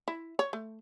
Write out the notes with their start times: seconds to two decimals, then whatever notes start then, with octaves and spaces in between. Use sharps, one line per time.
0.08 E4
0.39 C#5
0.53 A3